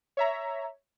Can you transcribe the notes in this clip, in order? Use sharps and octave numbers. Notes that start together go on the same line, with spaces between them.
C#5 E5 A#5